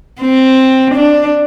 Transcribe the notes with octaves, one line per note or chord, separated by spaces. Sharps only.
C4
D4